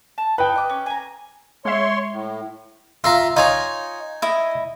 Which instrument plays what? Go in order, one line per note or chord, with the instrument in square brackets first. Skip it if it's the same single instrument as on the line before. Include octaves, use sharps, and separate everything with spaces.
[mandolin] A5
[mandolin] D#4 [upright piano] B4 G5
[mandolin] D#5 D6
C#4
G#5 A#5
[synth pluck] G#3 E5 [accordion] C#5 C6
[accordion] A2
[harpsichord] F4 F5 A#5 [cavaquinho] E5
[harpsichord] D#4 G#5 [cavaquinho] F4 C#5 D#5
[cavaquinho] E4 D#5